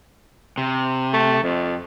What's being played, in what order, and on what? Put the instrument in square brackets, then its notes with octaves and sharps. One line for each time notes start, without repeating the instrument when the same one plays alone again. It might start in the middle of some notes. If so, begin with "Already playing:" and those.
[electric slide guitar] C3
[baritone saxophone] A3
F2